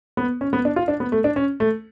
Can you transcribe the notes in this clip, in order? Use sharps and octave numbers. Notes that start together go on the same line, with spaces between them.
B3
C#4
B3
D4
F4
D4
B3
A3
D4
C#4
A3